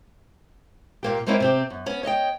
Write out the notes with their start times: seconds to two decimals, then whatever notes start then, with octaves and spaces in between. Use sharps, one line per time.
1.03 A#2 A#3 G4
1.27 G3 G#3 A#3 C4 C#4 E4
1.40 C3 C4 G4
1.70 F#2
1.86 B3 C#4
2.03 C#5 D#5 E5 G5